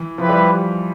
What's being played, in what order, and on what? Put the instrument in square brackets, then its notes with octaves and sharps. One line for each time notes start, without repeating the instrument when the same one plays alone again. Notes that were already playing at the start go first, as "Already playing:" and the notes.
Already playing: [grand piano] E3
[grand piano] F3 [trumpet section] E4 G4 B4
[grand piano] G3